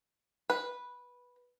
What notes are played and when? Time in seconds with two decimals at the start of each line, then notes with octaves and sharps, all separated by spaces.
0.50 B4